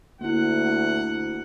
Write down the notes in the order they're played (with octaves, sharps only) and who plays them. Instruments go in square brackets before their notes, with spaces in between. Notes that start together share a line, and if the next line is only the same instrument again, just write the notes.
[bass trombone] D2 [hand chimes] A#3 E4 [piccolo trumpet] F#5